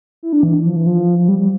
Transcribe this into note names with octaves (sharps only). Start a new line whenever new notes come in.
E4
D4
E3
F3
E3
F3
F3
G3
G3